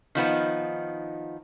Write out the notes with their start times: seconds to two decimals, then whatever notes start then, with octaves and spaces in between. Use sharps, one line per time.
0.15 D#3 F3 B3 D#4